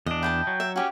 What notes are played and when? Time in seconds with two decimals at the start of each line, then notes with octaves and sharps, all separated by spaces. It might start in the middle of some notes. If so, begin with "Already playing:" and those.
0.06 E2 D4 D#5
0.23 E4 D#5 G5 A5
0.47 F#3
0.60 E5
0.76 C#4 F#4 G4